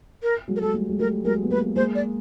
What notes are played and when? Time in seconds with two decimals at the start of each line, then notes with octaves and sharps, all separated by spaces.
0.23 A#4
0.48 F#3 G#3
0.56 A#4
0.61 G#3 A4
0.74 G3 A3
0.90 G#3
0.99 G3 A3 A#4
1.25 F#3 G#3 A#4
1.43 B3
1.50 G#3 A#3 B4
1.76 G#3 A#3 C5
1.95 D5